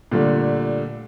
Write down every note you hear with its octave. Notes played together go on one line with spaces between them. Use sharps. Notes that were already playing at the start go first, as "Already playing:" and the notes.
A#2 D3 G3 A3